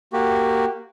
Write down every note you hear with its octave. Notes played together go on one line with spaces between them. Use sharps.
A#3 F#4 G4